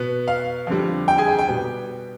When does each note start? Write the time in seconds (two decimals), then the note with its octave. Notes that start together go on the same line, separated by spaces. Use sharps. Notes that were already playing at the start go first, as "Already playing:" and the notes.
Already playing: B2 B3
0.28 F5
0.67 F2 D3 G3
1.08 G5
1.18 G#4 G#5
1.28 G5
1.39 G5
1.49 B2 G3 B3